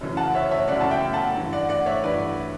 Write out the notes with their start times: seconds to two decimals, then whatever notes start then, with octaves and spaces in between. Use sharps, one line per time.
0.01 F#2 C#3 E3
0.17 F#5 A5
0.35 C#5 E5
0.51 C#5 E5
0.68 F#2 C#3 E3 D5 F#5
0.81 A5
0.91 E5 G5
1.13 F#5 A5
1.35 G2 E3
1.52 D5 F#5
1.69 D5 F#5
1.86 C#5 E5
2.04 G2 E3 B4 D5